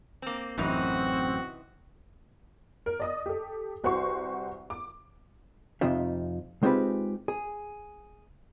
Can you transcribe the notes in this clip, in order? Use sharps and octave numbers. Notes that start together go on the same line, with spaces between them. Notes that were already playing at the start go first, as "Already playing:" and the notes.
A#3 C4
A1 F#2 C3 E3 C4 D#4 F#4
A#4
D5 D#5 D#6
G4 A4
C2 F#4 B4 C5 C#6
D6
F2 C3 F3 D#4 F4 E5
G#3 C4 D#4 F4 G4 B4
G#4